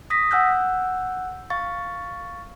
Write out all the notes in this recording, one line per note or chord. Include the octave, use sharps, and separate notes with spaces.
D#6 A#6 B6
F#5 G#5 E6 F#6 G6
F5 C#6 A6